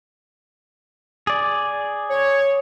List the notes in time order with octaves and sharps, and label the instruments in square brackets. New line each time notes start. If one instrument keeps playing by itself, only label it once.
[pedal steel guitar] G#4 D5
[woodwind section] C#5